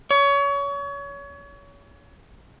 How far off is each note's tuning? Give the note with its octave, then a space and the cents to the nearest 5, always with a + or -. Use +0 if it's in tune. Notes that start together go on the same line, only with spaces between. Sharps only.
C#5 +30